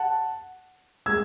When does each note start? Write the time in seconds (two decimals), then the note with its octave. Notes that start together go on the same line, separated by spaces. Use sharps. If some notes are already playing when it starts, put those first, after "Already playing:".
Already playing: F#5 A5
1.06 G#3 E6 G#6